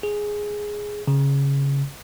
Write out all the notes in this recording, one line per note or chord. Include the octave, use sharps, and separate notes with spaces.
G#4
C#3